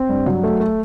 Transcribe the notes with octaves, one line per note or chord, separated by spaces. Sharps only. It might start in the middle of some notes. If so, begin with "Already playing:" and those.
Already playing: C4
G2
F#3
A3
A3